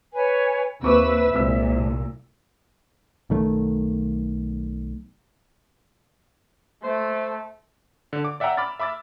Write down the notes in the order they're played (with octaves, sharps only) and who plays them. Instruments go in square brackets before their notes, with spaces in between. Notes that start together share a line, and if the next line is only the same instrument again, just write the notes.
[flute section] B4 C#5 G#5
[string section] D#2 B4 E6 [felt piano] C4 C#6 D6 [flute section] E5
[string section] C2 A#2 [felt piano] G#3 C4 E6
[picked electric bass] B1 D#3 A3
[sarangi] A3 [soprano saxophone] C5
[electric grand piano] D3
D6
D5 E5 F#5 G5 A#5 E6
B5 D6 F6 A6
E5 B5 D6 E6 A6